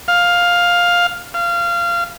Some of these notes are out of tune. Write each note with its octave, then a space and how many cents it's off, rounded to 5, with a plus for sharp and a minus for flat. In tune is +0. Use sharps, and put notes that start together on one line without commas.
F5 +10
F5 -20